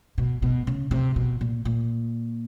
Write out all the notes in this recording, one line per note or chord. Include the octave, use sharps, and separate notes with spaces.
B2
B2
C#3
C3
B2
A#2
A#2